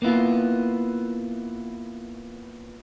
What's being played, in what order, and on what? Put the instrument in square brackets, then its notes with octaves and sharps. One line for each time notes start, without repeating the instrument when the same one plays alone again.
[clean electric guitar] A#3 B3 E4 F4